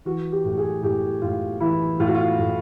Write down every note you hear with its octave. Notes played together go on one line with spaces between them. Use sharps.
E3 F#4
G4
A2
G#4
A2 G4
A2 F4
E3 E4
A2 F4
F#4
F4
A2